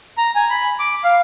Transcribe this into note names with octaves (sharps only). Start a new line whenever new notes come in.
A#5
G#5
B5
D6
F5